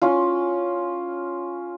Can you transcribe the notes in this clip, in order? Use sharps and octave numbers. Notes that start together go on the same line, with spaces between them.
C#4 F4